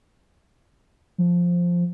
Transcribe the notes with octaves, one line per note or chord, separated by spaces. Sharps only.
F3